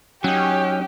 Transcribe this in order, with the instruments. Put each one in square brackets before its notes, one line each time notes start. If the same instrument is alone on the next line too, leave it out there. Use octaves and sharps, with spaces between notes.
[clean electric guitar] F#3 D#4 [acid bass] C#4 [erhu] G4